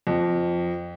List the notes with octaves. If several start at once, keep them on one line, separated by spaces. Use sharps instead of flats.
F2